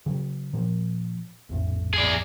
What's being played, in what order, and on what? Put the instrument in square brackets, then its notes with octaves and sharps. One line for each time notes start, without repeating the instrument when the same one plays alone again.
[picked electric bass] C#3 F#3
A#2 F3
A#1 F2 A2
[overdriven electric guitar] G#4 D5